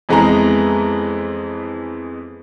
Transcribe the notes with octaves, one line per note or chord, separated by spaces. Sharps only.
F2 E3 G#3 B3 G#5 A#5